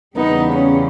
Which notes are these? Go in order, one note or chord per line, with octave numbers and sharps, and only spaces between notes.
E2 C#3 G3 B3 D#4
C#4